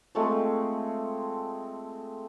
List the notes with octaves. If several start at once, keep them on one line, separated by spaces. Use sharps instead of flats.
F3 G#3 A3 C4